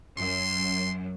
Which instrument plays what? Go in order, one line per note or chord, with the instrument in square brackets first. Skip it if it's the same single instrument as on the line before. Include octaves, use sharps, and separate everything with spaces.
[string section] F#2 [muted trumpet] C6